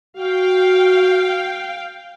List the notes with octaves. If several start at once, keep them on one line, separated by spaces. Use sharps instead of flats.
F#4 F5 G5